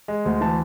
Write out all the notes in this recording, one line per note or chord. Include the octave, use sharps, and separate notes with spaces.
G#3
D2
E3 A5